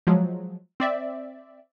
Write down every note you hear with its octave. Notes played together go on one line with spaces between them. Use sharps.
F3 F#3 G#3
C4 D5 E5